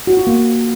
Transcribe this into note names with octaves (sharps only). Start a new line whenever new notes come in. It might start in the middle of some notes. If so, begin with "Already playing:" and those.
F#4
F4
A#3